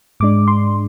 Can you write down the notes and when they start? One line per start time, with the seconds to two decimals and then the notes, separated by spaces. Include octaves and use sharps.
0.20 G#2 G#3 D4 D6
0.48 C6